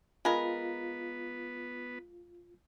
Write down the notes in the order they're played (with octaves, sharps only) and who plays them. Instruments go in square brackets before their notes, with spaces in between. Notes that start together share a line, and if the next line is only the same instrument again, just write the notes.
[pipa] G#3 A#4 [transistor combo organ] B3 B4 [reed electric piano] F4 [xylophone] B5